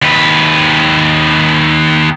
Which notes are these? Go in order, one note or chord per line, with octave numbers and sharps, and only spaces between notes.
D#2 B4